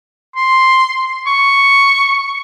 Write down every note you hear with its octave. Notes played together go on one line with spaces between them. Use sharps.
C6
C#6